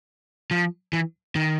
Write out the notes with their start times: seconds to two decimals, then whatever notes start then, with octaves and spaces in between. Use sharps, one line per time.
0.51 F3
0.93 E3
1.36 D#3